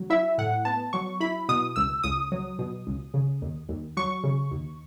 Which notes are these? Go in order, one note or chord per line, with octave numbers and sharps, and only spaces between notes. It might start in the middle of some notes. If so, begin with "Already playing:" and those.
Already playing: F#3
E4 E5
A2 F#5
B3 A5
F#3 C#6
E4 B5
B2 D#6
C#2 E6
C#2 D#6
F#3
B2
C#2
C#3
D#2
D#2
F#3 C#6
C#3
D#2